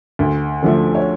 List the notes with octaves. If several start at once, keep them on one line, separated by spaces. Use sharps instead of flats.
D2
D3 F3 A3
C#5